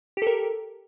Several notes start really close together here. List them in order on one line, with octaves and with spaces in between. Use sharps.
G4 A4 A#4